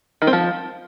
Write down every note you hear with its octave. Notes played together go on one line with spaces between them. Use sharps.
D#3
C4
F3